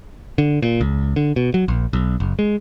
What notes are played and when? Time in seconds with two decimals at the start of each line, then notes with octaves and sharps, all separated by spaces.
0.38 D3
0.62 A#2
0.81 C#2
1.16 D3
1.36 B2
1.54 F#3
1.68 A#1
1.93 B1
2.20 F#1
2.39 G#3